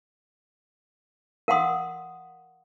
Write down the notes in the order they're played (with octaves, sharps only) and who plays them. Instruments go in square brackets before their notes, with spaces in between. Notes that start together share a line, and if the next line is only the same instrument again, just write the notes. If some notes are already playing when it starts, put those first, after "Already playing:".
[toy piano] A#4 F5 F#5 C6 D#6